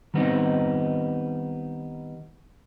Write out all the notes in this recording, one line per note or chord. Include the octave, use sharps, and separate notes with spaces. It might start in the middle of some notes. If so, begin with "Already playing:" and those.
D#3 G3 B3 C4 D4 D#4